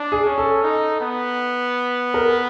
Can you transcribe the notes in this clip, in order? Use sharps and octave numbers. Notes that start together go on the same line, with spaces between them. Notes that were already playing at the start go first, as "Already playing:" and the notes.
Already playing: D4
G#4
C#4
A4
D#4
B3
A#4